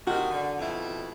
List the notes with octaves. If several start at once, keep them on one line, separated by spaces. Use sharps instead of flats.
C3 D#3 F#4
D3
F2 B2 E4